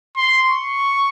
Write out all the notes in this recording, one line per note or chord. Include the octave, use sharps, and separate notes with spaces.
C6
C#6